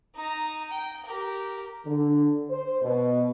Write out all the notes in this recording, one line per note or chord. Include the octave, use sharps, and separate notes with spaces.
D#4 A#5
G5
G4 A#4
D3
C5
B2